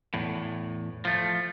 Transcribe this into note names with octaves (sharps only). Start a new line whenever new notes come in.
E2 A2
F3 A3